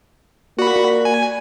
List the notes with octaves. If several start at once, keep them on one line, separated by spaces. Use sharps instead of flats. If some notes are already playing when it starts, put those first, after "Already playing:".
A#3 F#4 D5 B5
G#5